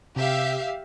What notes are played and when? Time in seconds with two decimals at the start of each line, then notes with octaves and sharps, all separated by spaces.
0.16 C3 G4 E5 F5